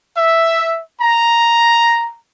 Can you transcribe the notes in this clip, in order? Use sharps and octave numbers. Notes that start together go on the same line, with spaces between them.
E5
A#5